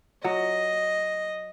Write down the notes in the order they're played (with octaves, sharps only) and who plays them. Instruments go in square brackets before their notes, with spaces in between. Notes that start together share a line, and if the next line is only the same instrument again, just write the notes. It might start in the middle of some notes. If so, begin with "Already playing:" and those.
[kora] F#3 [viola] D#5